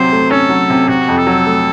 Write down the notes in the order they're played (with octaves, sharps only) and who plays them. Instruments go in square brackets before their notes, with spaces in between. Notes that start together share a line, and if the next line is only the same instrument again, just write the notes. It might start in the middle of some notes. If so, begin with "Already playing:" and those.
Already playing: [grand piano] C3 F#3 [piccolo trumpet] C5
[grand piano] A3
[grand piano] C#4 [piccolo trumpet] A4
[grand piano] F#3
C3
[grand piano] C3 [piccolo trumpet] F#4
[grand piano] F2
[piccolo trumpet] A4
[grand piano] F#3
A3